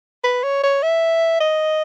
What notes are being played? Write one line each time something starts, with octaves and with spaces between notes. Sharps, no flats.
B4
C#5
C#5
E5
D#5